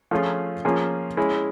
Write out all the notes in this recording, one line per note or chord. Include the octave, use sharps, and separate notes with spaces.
F3 A3 C#4 F4 G#4
F3 A#3 C#4 F4 G#4
G#3 C#4 E4